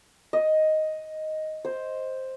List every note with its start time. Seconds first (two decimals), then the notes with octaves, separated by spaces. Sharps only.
0.33 D#5
1.65 C5